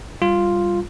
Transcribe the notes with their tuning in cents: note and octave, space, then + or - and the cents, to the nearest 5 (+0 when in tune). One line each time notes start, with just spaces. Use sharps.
G3 +0 F4 +0